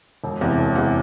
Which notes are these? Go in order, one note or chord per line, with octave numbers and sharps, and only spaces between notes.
E1
E2 C3
E1
E2 C3